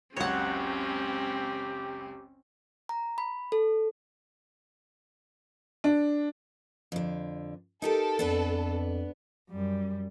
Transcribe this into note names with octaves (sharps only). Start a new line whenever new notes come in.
F#1 C#2 C4 C#4 G4 C#5 F#5
A#5
B5
A4
D4
F2 D3
D#4 G4 A4 A#4
F2 B3 D4 B4
F#2 G3